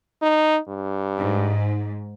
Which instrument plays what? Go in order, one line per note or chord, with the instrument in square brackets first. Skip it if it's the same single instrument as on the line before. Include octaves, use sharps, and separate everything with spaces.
[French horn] D#4
G2
[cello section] G#2